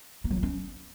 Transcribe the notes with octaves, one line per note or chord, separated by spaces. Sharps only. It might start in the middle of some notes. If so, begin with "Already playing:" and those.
A#3
F#3
F4
C#4